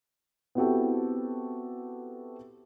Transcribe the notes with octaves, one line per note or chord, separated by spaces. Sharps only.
B3 C4 E4 F#4 G4 A4